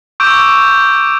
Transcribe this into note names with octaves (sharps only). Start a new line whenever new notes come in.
C#6 D6 E6 G6 D7